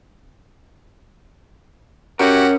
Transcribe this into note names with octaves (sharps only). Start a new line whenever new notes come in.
C#4 F#4 G4 A#4 F#5